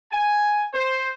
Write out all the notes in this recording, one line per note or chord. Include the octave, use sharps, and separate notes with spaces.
G#5
C5